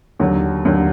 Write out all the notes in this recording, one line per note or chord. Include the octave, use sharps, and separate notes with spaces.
D#2 D3 F#3
D#2 D3 F#3